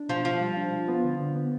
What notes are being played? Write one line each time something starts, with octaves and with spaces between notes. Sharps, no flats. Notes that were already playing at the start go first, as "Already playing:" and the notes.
Already playing: D4
B2 F3
F3 F4
G3
D4
F4
B3
D3
D3
B3